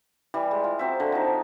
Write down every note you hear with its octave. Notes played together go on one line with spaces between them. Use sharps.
E3 G3
G#3
F4
F#3 C4 E5
D3
F3 D#4